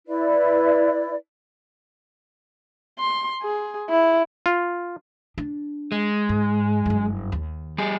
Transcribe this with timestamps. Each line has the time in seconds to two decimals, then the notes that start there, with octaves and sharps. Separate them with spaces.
0.08 E4 B4 D5
2.99 C6
3.42 G#4
3.90 E4
4.46 F4
5.38 D4
5.92 G#3
6.29 G#2
6.86 F#1 G2
7.32 D#2
7.78 G3 G#4